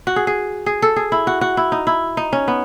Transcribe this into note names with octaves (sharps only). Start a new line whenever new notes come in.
F#4
G#4
G#4
G#4
A4
G#4
E4
F#4
F#4
E4
D#4
E4
D#4
C#4
B3